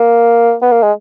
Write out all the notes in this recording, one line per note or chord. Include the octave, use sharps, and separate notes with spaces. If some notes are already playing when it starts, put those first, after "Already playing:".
Already playing: A#3
B3
A#3
G#3